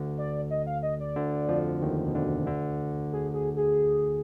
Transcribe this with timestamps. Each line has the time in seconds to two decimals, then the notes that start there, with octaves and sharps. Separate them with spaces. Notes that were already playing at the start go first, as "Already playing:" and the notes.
Already playing: D2 D3
0.18 D5
0.51 D#5
0.67 F5
0.83 D#5
1.00 D5
1.16 D2 D3
1.48 F2 F3
1.82 D#2 D#3
2.08 B2
2.14 D2 D3
2.46 D2 D3
3.13 G#4
3.34 G#4
3.56 G#4